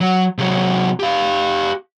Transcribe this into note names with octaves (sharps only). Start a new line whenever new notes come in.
F#3
C3 F#3
G4 F5